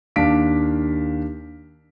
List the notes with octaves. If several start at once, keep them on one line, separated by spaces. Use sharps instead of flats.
D#2 D4 F5 B6 D7